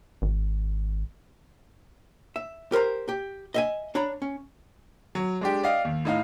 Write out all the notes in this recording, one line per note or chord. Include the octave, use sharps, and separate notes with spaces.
G#1
E5
G4 A#4 C5 A#5
G4
D#5 E5 G#5
D4 C#5 A#5 B5
C#4
F#3
G#3 D4 G4
D5 D#5 F5 G5
D#2
A2 D#4 F5